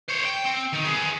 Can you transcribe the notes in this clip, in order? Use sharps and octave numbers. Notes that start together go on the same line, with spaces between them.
C5 C#5
G5
C4
D#3
G#4 B4